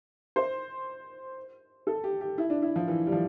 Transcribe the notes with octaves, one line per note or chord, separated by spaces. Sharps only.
C5
A4
G4
G4
E4
D4
E4
F3
E3
G3
F3